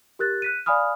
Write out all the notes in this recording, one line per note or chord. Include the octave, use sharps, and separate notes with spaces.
G4 A#4 F#6 A6
F#6 B6 D#7
D5 F5 G#5 B5 D#6 F6